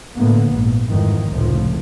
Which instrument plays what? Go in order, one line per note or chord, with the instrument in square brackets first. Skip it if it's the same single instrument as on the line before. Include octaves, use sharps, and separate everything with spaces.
[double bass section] A2 D3 A#3 B3
A#1 G#2
G1 F2 G#2 D#3 E3
F1 C#2 A2 F3